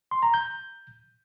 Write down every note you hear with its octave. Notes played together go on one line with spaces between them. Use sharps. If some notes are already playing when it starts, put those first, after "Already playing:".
C6
A#5
G6